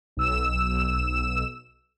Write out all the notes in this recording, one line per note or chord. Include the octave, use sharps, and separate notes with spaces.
B1 E6 E7